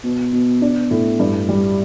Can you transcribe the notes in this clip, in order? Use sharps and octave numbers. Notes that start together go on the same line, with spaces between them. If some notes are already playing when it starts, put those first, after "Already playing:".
B2
B2
D4
A2
G2
G3